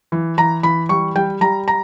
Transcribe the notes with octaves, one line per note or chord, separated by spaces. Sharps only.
E3
E3 A#5
E3 B5
G3 C#6
G3 G5
G3 A#5
A#5